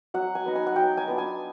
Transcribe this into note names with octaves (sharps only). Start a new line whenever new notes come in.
F#3 F#5
G#5
B3 D#4
G#5
F#5
F#3 G5
G#5
B3 D4 F4
G#5